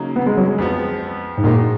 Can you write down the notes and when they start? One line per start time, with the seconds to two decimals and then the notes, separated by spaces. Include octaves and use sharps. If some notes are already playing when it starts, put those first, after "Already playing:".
Already playing: C#3 F#3 A#3 D#4
0.16 B3
0.27 G#3
0.37 F#3
0.48 G#3
0.58 F2 F3 B3
1.38 G#2
1.43 A#2 F3 G#3 D#4 F#4